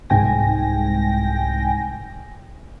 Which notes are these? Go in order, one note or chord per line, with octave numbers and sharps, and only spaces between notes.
C2 G#2 G5 G#5 A#6